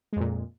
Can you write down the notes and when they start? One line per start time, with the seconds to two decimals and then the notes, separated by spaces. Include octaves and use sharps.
0.13 G#3
0.16 F2
0.20 A#2